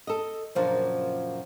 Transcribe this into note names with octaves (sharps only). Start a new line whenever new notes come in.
A4 D#5
F#2 A#2 C#3 F3 D4 F4